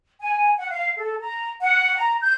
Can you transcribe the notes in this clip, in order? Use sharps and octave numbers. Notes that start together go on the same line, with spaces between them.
G#5
F#5
F5
A4
A#5
F#5
A#5
G6